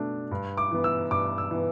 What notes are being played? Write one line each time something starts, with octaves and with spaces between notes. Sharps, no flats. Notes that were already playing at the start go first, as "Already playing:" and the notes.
Already playing: B2 A3 D4
G2
D6
E3 B3
E6
G2 D6
E6
E3 B3